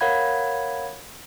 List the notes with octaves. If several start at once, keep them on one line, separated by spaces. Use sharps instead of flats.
A#4 C#5 F5 F#5 B5 G#6